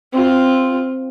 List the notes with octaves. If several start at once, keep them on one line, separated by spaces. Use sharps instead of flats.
C4 F4